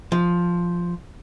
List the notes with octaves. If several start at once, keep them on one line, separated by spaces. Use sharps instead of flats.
F3